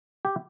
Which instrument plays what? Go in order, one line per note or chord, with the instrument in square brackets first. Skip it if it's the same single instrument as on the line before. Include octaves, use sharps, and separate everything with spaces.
[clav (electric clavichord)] G4